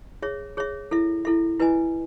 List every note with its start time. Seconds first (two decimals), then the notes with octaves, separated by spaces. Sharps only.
0.22 G#4 C#5 E5
0.57 G#4 C#5 E5
0.91 E4 A4 E5
1.25 E4 A4 E5
1.60 E4 B4 D#5 G#5